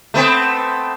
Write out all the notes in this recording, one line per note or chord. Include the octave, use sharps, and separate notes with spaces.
A3 B3 C4